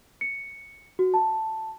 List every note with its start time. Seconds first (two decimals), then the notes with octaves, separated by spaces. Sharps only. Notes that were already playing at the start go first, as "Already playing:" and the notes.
0.21 C#7
0.99 F#4
1.14 A5